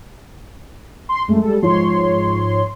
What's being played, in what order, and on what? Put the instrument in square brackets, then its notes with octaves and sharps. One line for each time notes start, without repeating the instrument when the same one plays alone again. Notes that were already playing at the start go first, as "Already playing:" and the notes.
[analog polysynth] C6
[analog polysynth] F#2 A3 [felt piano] G#3
[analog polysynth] G3 A4
[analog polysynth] G#2 C#5 C6 [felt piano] F3